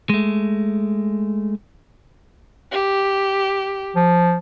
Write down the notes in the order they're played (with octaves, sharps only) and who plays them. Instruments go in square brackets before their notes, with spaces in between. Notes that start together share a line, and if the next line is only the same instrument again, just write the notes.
[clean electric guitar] G#3 A3
[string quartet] G4
[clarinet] F3